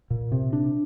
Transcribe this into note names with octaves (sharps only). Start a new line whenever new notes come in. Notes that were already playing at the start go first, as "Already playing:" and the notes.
A#2
C3
D4